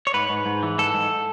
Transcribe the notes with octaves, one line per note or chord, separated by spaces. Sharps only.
C#5
G#2 B4
G#2
G#2
E3
G#2 A4
G#2